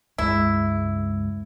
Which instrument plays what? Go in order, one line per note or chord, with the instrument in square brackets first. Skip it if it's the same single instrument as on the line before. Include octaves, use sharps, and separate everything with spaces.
[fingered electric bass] C#2 G2 G#3 [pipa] E4